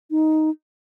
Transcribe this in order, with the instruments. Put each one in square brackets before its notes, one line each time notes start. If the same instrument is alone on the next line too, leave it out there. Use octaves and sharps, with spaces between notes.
[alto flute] D#4